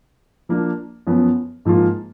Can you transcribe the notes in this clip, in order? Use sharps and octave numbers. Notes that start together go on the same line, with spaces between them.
F3 A#3 D4
F#2 F3 B3
G#2 F3 A#3 F4